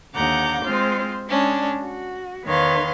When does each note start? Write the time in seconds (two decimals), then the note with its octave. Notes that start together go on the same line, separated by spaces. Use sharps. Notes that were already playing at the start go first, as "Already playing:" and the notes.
0.15 D#2 D3 F#5 A#5 D6 G6
0.64 G#3 C4 F4 C5
1.27 G#3 C#4 D4
1.83 F#4
2.44 E2 D#3 B4 C#5 F5 C6